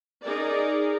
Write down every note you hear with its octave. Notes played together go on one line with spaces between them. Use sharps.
D#4 G#4 A#4 D5